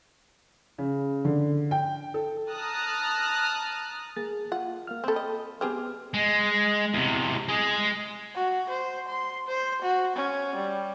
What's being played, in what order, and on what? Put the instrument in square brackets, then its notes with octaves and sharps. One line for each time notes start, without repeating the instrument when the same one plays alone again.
[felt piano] C#3
D3
G5
A4
[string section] A5 A#5 D#6 F6 F#6
[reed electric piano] A#3 G#4 A6
[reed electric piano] F4 [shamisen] F#5
[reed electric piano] A#3 F5 F6
[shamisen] C4 A4 [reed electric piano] G5 B5
[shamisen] D#5
[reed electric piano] B3 B4 F6 [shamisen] C4 G4 G#4
[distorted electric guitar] G#3
E2 C3
G#3 G#4
[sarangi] F#4
C5
C6
C5
F#4
C#4
G3